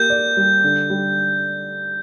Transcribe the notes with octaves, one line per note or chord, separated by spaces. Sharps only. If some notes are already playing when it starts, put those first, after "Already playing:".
Already playing: A#3 G4 G6
D5
G3
D3
G3